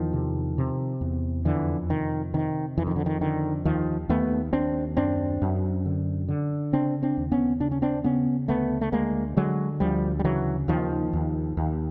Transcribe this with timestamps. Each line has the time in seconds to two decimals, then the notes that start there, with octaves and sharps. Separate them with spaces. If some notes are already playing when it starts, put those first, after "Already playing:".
Already playing: E2 D#3 F3
0.13 C3
0.58 C3
1.01 E2
1.45 F2 D3 E3
1.89 C3 D#3
2.34 C3 D#3
2.77 F2 E3
2.87 D#3
2.96 D3
3.06 D#3
3.21 D3 D#3
3.65 D#2 D#3 F3
4.09 D#2 A3 B3
4.53 D#2 C4 D4
4.97 F#2 C4 D4
5.42 F#2
5.86 D3
6.28 D3
6.73 C#3 C4 D4
7.03 C4 D4
7.17 D#2
7.32 B3 C#4
7.60 C#3 D4
7.72 C#4
7.82 C4 D4
8.04 C#3 B3 C#4
8.48 D2 A3 B3
8.81 A3
8.92 D2 G#3 A#3
9.36 D3 F#3 G#3
9.80 D2 F3 G3
10.19 G3
10.24 C#3 E3 F#3
10.68 D#2 D#3 F3
11.13 D#2
11.57 D#2